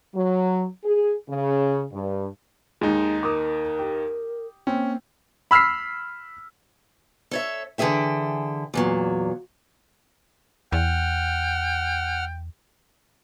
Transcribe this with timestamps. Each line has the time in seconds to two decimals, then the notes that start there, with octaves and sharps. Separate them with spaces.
0.15 F#3
0.84 G#4
1.29 C#3
1.92 G2
2.81 D#2 D#3 G#3 D#4
3.23 A#4 D6 D#6
3.79 G4
4.67 A#3 C4 C#4
5.51 B5 E6 F6 B6 C7
7.31 A4 C#5 E5
7.78 D3 E3 G#4 E5 G5
8.74 E2 A#2 F#3
10.72 E2 F#5 G5 F6